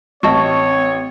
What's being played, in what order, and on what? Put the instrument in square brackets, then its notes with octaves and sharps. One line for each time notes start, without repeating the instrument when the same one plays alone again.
[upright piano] A1 [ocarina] C4 [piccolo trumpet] C#5 [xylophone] D#5 A5 C#6